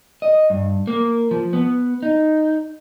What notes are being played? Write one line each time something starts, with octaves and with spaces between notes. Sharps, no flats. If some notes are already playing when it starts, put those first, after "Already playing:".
D#5
G2
A#3
F3
B3
D#4